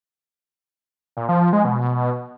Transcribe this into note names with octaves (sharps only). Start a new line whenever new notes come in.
A#2
F3
F3
G#3
B2